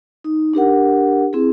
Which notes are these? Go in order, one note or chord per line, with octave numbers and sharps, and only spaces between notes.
D#4
D4 G4 A#4 F#5
C4 E4 G#4